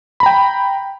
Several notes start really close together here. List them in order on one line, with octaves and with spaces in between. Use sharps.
B5 A#5 G5